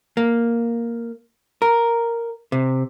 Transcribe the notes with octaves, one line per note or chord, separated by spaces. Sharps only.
A#3
A#4
C3